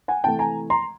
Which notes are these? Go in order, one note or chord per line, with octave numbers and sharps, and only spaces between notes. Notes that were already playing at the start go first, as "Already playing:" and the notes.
F#5 G#5
C3 E3 A3 G5 A5
G#5 A#5
A#5 C6